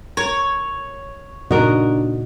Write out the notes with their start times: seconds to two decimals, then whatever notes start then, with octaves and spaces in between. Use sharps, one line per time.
0.17 A#4 C#5
1.51 A#2 C#3 D4 D#4 F#4 A#4 D#5